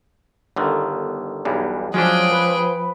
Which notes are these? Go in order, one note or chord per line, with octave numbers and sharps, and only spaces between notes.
G1 D3 D#3
B1 E2 G2
F3 F#3 G#3 C#4 D4 G#4 G5
B4